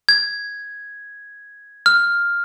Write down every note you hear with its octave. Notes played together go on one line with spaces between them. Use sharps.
G#6
F6